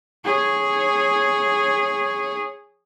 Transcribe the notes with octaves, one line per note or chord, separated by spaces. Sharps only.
G#4 C#5